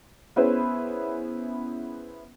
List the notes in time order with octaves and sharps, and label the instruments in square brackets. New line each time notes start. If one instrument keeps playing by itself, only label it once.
[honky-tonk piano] B3 C#4 E4 G#4 B4 C5